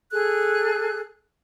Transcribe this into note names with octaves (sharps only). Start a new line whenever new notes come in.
G#4 A4 F#6